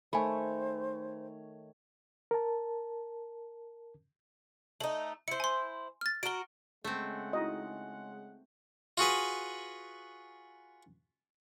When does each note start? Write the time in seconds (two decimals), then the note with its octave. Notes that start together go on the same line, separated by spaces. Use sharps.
0.13 D#3 A3 C5 C#5 G#5 B5
2.31 A#4 A5
4.80 A3 D#4 F#7
5.28 E4 C5 C#7
5.40 G#5 C6
6.01 F6 A6
6.23 F#4 A#4 D7 G7
6.84 C#3 G#3 A3 C4 F#5
7.33 D#4 E4 F#4 D#5
8.98 F4 F#4 G#4 B4